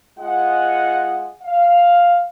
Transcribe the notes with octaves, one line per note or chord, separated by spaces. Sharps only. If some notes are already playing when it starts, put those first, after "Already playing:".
G#3 F4 D#5 F#5
F5